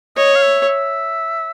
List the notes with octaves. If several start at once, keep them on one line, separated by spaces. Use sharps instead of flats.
C#5 D#5
F5
E5
E5